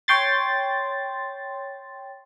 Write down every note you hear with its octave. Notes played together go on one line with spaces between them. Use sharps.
C#5 G5 C6 A6